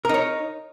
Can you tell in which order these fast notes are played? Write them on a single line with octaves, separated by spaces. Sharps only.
A#4 D#4 C#5